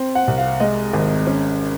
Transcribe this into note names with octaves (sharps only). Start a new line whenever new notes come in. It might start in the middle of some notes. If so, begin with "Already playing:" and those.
Already playing: C4
F#5
C2
F5
G#3 D#5
G#1
C#4